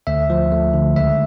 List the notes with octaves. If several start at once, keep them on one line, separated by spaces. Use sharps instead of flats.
D2 E5
F3
A3
D3
C#2 E5